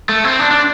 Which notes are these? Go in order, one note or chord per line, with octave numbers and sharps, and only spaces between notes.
A3
C4
D4
D4